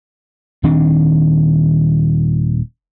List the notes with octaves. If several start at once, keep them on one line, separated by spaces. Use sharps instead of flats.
D#1 D#3 C4 D4